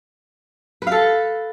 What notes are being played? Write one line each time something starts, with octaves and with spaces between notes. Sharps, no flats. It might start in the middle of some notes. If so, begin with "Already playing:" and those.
A4 B4 F5